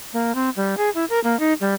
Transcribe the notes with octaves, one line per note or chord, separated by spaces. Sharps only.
A#3
C4
G3
G#4
E4
A#4
A#3
D#4
G3